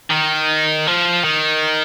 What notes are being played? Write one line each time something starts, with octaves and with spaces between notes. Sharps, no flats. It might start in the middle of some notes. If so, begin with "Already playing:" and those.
D#3
F3
D#3